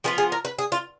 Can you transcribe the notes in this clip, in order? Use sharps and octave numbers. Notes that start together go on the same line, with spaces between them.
F3 B3 F4 G#4
G#4
A#4
B4
G#4
F4